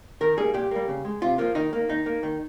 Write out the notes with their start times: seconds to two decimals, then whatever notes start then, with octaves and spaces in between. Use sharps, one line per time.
0.21 D#3 A#4
0.37 G3 A#3 G#4
0.54 A#2 G4
0.71 G3 A#3
0.88 C#3
1.05 G#3
1.22 C3 F4
1.38 F3 A#3 F4
1.55 D#3 D#4
1.73 A#3
1.89 D#3 D#4
2.06 A#3
2.23 D#3